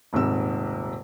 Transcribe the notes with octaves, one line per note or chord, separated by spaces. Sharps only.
D#1 G#2 C3 E6